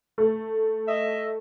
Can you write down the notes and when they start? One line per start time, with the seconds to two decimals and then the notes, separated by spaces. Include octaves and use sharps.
0.18 A3
0.88 D#5 E5